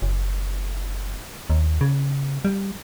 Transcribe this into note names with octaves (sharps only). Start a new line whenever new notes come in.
F#1
D#2
C#3
G3